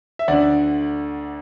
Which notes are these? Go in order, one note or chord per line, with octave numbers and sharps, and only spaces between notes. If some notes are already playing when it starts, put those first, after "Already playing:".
E5
D2 D3 D5 F#5